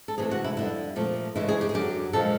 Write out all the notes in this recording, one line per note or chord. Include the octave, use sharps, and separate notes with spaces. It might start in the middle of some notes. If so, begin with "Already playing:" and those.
A4
C3 E3 A3 G#4
F#4
E4
F2 D3 G3 E4
A#2 F3 A3 C4
D2 C#3 E3 G#3 E4
G#4
G4
G#4
F#2 D3 F#3 G4
A#2 F3 G#3 A4